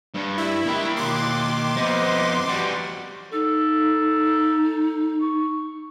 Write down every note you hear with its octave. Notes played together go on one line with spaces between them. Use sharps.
G2
E4
G#3 A#3 G5
B2 D#3 C6 D6
F2 B3 C5 D#5
E3 G3 F#4 B4 C5
D#4 A4
C#6